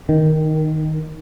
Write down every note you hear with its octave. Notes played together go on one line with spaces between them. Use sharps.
D#3